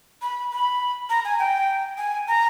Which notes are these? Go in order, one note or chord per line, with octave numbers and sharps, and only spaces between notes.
B5
B5
A#5
G#5
G5
G#5
A#5